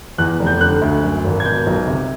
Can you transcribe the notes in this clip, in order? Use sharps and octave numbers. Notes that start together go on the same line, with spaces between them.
E2 F#6
F1
G6
D3 F#6
D2
F#2
G#1
G#6
B2 G6
B1
C3